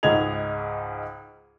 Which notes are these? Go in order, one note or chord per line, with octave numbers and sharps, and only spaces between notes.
C#2 G#2 D#4 D#5 G#6 F7